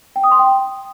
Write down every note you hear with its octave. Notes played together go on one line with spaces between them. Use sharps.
G5
D#6
C6
G5